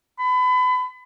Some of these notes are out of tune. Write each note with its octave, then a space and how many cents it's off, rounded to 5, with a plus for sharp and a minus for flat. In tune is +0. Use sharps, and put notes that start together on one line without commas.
B5 +30